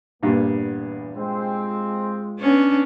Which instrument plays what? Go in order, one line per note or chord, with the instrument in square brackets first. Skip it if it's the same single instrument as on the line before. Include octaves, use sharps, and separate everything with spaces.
[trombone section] E2 B3 [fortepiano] G2 A#2
[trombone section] G#3 F4 [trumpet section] C4
[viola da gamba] B3 C#4 D4